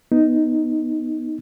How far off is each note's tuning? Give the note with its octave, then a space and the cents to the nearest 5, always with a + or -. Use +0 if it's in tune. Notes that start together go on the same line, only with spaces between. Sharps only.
B3 +0 D#4 +0